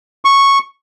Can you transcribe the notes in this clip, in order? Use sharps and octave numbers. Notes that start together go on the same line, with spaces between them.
C#6